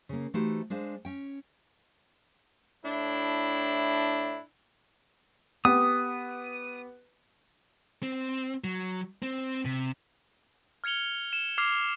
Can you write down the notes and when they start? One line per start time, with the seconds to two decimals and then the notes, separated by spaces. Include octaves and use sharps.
0.09 C#3 A#3
0.34 E3 A3 D#4 F#4 G4 C5
0.70 G#3 D4 C5 F5
1.05 C#4 G5
2.85 A2 D4 E4
5.65 B3 G4 D#6
8.03 C4
8.64 F#3
9.22 C4
9.65 C3
10.84 F6 G#6 C#7 F7 G7
11.33 E7
11.58 D6 F6 G#6 C7 F7